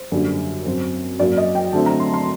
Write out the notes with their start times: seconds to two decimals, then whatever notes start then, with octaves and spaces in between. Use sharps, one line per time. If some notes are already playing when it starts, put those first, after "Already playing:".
Already playing: C5
0.12 F#2 D3 G3 A#3
0.65 F#2 F#3 C4
1.19 F#2 F#3 A#3 D5
1.37 D#5
1.55 G5
1.73 D3 F#3 A3 C4 A5
1.86 A#5
2.00 C6
2.14 C6